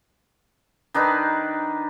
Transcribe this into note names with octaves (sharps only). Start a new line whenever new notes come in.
D#3 D4 D#4 B4